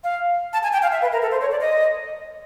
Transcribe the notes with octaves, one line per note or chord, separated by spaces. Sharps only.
F5
A5
G#5
G5
F5
E5
B4
A#4
A4
C5
C#5
D5
D#5